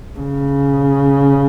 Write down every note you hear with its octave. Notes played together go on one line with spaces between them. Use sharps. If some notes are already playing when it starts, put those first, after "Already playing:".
C#3